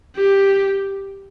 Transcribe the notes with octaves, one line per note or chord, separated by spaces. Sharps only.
G4